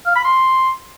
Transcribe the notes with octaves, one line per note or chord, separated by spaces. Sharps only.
F5
B5
C6